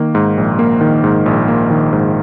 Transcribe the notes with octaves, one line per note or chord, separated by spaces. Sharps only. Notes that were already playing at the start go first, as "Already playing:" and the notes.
Already playing: D#3 A#3
G#2
A#1
A#3
D#3
G#2
A#1
A#3
D#3
G#2